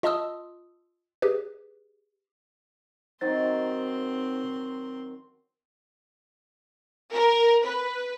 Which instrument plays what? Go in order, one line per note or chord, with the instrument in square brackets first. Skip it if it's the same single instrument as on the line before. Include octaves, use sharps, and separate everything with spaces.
[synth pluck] F4 D#5 A5 C6 D#6 E6
G4 G#4 B4
[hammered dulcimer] D#3 F#3 [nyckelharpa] C4 C6 [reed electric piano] D#4 C5 A6
[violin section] A#4
B4